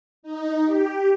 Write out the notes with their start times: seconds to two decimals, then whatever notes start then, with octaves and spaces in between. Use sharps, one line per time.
0.23 D#4
0.65 G4